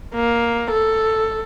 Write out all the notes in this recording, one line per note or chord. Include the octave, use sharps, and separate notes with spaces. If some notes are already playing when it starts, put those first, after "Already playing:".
A#3
A4